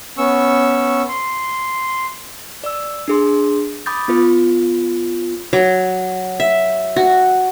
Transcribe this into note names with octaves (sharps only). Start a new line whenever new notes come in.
B3 C#4 C#6 E6
C6
D5 E6
D4 G#4 C6
B5 D6 D#6 G6 A6
B3 F4 B4
F#3
E5
F#4